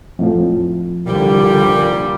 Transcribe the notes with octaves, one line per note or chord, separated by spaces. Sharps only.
F2 A2 F3
C2 A#2 D3 G3